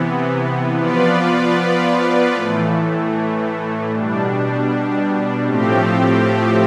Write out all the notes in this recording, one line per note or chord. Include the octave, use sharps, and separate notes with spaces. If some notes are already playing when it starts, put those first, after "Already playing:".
Already playing: C3 E3 B3
F3 B3 F4 B4 D5
A2 E3 A3
B2 G3 D4
A2 F3 A3 C4 G4